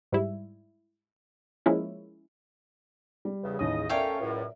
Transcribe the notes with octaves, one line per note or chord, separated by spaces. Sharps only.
G#2 G3 E4
F3 G#3 A#3 C#4 E4
G3
E2 C#3
A1 D#2 C#3 D#5 D#6
A3 C#4 F4 A#4 C#5 D5 E5 G5
C#2 F#2 A2